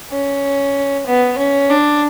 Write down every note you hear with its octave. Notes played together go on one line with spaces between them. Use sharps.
C#4
B3
C#4
D4